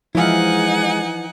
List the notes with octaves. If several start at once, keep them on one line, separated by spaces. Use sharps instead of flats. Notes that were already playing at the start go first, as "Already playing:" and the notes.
E3 F3 G#3 D#4 E4 F5 F#5 G#5